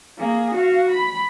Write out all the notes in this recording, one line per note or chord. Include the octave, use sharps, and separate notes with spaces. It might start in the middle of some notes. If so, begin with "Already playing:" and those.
A#3 G#4
F#4 F5
B5